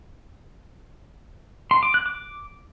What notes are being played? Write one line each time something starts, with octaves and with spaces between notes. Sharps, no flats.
C6
D6
F#6
D6